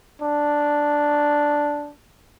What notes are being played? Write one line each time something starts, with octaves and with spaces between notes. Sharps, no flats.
D4